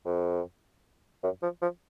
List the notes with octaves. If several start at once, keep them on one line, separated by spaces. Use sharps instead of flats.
F2
F#2
F3
F3